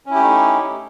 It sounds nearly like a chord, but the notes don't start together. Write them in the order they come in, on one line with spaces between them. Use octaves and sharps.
C#4 E4 G4 A3 D#4